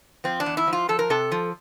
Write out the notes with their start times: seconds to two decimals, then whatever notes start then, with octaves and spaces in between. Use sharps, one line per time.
0.24 F3 C4
0.40 D4
0.46 E2
0.57 E4
0.67 F3
0.73 F4
0.89 F3 A4
0.99 A#4
1.10 C3 A4
1.32 F3